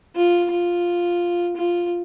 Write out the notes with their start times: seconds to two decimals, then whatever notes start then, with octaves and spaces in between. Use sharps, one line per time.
0.16 F4
0.50 F4
1.56 F4